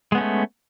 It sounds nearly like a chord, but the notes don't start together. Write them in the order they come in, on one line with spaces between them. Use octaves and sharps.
G#3 B3 C#4 A3